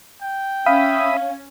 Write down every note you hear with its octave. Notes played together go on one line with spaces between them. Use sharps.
G5
C#4 E5 F5 B5 D#6